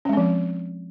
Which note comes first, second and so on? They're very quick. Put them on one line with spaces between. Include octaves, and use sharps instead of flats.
C#4 G#3 C4 F3